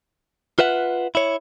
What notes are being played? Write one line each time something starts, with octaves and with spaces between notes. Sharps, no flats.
F4 B4 E5 F#5
E4 C#5